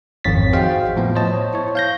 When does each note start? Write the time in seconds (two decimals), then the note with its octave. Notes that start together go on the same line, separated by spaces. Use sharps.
0.24 G#1 F2 D#3 C#5 A6 B6
0.53 F#4 G#4 C5 D#5 F5 G5
0.97 A2 F3 B3
1.15 C5 C#5 D#5 A5
1.54 E4 C#5
1.75 F5 G6 A#6